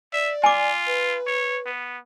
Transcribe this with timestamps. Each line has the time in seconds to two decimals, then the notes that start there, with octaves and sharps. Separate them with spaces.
0.13 D5 E5
0.44 F4 G#5 D6
0.87 B4
1.27 C#5
1.66 B3